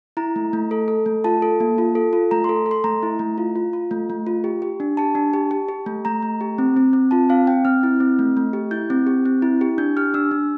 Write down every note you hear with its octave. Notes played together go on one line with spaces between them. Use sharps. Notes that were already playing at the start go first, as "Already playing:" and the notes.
E4 A#5
A3
A3
A4
A4
A3
F4 A5
A4
A#3
F4
A4
F4
A3 A#5
A4 C6
A4
C6
A3 A#5
E4
A3
F4
F4
F4
A3
A3
F4
G4
G4
D4
G4 A5
D4
G4
G4
G4
A3
A3 A#5
A3
G4
C4
C4
C4
F4 A5
C4 F5
C4 G5
C4 F6
E4
C4
A3
A3
G4
E4 G6
C4
G4
C4
E4
G4
D4 G6
G4 F6
D4 E6
D4